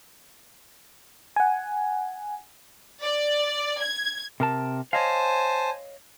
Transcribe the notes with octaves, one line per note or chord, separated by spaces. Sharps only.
F#5 G#5
D5
G#6
C3 A#4 A5
C5 C#5 D#5 F5 G#5 A5